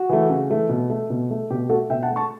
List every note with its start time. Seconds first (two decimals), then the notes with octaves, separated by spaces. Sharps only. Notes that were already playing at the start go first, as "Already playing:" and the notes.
Already playing: F#4
0.09 E3 A3
0.30 C#3
0.50 E3 A3
0.69 B2
0.90 A3
1.10 B2
1.30 A3
1.50 B2 G4
1.69 A3 F#4 A4
1.90 B2 E5 G5
2.03 F#5 A5
2.10 A3
2.16 A5 C#6